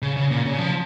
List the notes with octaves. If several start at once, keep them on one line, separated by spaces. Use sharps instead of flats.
C#3
C#3
A#2
C#3
F3